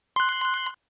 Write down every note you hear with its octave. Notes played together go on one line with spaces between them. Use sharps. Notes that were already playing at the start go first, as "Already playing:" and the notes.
C6 F#6